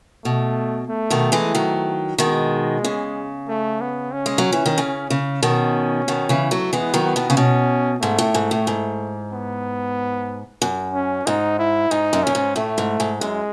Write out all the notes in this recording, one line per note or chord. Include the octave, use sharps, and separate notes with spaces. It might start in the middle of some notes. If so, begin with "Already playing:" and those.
B2 A3
A3
B2 D#3
E3 G#3
D#3 F#3
B2 D#3 G#3
C#3
A3
B3
C#4
G#3
F#3
E3
D#3
C#3
C#3
B2 D#3 C#4
B2 D#3
C#3 E3
F#3 A3
E3 G#3 B3
D#3 F#3
B3
B2 D#3
C#3
B2 C#4
G#2 A3
A2
G#2
A2
G#2
B3
F#2
C#4
G#2 D#4
E4
G#2 D#4
F#2
F#2 C#4
G#2
A2 A3
G#2
G#2
F#2 G#3